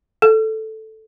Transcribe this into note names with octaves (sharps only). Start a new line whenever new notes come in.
A4